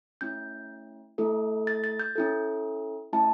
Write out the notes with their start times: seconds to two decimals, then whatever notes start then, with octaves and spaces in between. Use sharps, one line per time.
0.21 A3 C#4 E4 G6
1.18 A3 E4 A4
1.67 A6
1.84 A6
1.99 G6
2.16 C#4 E4 A4
3.13 A3 C#4 E4 A5